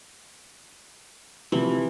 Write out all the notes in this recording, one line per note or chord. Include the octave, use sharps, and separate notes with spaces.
C3 E3 F3